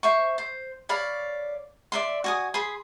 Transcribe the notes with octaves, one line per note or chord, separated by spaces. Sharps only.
C5 E5 C#6
C5
C#5 D5 F5 B5
D5 E5 C6
F#4 G#5 D#6
G#4 B5 C6